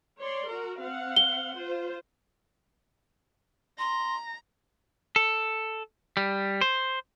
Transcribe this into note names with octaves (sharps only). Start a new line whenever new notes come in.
C#5 D5 C6
F#4 A#4
C4 F5 F#5
G7
F4 C5
A#5 C6
A4
G3
C5